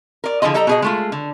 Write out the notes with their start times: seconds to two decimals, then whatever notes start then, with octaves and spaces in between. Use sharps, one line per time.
0.24 A#4 D5
0.42 D3 F3 E4 G#4 D#5
0.54 G3 A4 D#5 A#5
0.67 B2 G#4 D#5
0.82 G#3 A3 F4
1.12 D3